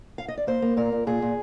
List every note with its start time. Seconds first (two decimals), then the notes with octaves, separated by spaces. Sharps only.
0.18 F5
0.28 D#5
0.37 D5
0.47 A#3 C5
0.62 A#3
0.77 A#2 A#4
0.92 A#2
1.07 A#2 G#4
1.22 A#2